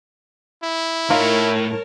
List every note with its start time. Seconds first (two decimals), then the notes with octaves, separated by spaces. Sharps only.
0.64 E4
1.10 A2 D#4 F4 A#4 C#5 A5